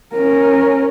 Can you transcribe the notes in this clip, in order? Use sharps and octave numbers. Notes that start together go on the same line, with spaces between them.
C#4 A#4